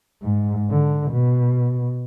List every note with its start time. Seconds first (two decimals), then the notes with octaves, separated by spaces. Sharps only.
0.22 G#2
0.70 D3
1.12 B2